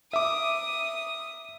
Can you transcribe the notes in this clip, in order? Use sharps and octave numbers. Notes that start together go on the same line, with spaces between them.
E5 D6 D#6